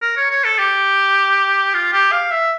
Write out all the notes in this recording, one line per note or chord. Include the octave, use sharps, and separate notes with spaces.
A#4
C#5
C#5
A4
G4
F4
G4
F5
E5